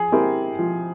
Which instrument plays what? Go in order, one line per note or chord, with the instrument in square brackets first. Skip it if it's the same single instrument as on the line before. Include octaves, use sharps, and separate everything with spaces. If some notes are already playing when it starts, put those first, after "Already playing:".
Already playing: [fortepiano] F3 [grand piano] G#4
[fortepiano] C4 E4 G4 A#4
F3